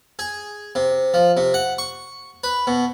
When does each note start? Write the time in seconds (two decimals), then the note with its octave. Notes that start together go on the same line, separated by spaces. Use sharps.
0.19 G#4
0.75 C3
1.14 F3
1.37 C3
1.54 F#5
1.78 C#6
2.44 B4
2.67 B2